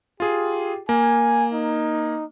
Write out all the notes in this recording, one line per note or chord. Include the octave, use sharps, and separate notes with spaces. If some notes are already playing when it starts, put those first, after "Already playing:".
F4 G4 G#4
A#3 G#5
D#4